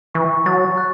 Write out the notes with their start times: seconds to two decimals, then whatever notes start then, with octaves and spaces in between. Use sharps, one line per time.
0.15 E3 C#6
0.46 F#3 A6
0.78 F#6